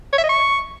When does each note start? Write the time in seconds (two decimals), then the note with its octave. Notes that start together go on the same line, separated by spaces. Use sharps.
0.13 C#5
0.18 E5
0.24 D#5
0.29 C#6